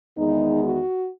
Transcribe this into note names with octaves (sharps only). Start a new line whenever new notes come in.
E2 D#3 G#3 B3 D#4
F#4